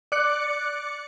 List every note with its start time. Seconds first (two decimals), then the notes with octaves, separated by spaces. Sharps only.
0.12 D5 D6 F#6 C#7